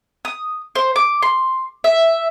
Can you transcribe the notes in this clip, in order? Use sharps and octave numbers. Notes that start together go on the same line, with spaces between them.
D#6
C5
D6
C6
E5